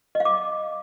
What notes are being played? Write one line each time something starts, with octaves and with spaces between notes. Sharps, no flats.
D#5
F5
D6